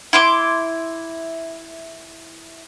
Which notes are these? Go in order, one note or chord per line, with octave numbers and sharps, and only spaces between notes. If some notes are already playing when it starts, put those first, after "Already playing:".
E4 C6 D6